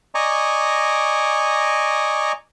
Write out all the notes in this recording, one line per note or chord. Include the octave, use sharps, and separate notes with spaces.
D5 D#5 G#5 A#5 C#6 D6